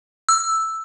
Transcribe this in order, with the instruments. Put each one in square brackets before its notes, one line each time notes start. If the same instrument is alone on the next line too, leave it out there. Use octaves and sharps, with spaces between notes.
[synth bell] E6